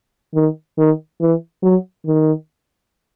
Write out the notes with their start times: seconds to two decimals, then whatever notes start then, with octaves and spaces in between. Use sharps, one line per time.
0.34 D#3
0.78 D#3
1.20 E3
1.63 F#3
2.06 D#3